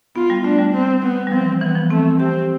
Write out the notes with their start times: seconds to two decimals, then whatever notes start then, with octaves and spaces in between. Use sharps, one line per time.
0.16 B3 F4
0.30 G3
0.44 A3 D4
0.59 G3
0.74 C4
1.03 B3
1.27 G3
1.32 F3 C4
1.41 E3
1.61 E3 B3
1.76 F3
1.90 A3 C4
2.19 C4 G4